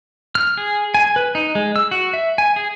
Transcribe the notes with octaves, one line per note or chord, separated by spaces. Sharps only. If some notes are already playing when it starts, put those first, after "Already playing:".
F6
G#4
G#5
B4
D#4
G#3
E6
F#4
E5
G#5
G#4